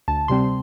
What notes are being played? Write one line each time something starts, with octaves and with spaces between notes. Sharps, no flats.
D2 A5
C3 G3 C4 C6